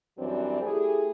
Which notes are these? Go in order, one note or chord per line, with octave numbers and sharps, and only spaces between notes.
F#2 E3 F#3 G3 C4 D4
A3 E4 G4 G#4